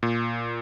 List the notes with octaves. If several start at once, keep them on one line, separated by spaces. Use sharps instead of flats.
A#2